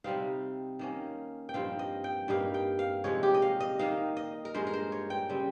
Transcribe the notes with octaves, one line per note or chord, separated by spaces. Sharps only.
C3 G3 C4 D#4 F5
D#3 A#3 C#4
G5
G2 F3 C4 D#4 F5
D#5
G5
G2 G3 A#3 D#4 F5
G5
F5
C3 F3 G#3 D#4 C#5
G4
D#5
F5
D#5
D#3 A#3 D#4 F5
D#5
A#4
G2 F3 G#3 C5
A#4
C5
C#5
G5
C#3 G3 C4